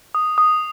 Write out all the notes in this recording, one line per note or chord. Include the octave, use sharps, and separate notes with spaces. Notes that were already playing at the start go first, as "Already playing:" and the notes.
D#6
D#6